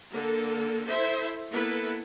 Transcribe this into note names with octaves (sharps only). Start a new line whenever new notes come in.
D3 A#3 A4
E4 A4 C5 E5
A#3 B3 E4 A4 B4